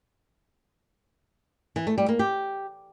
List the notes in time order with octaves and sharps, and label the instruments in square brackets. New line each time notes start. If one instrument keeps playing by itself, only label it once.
[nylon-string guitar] E3
A3
G3
A#3
G4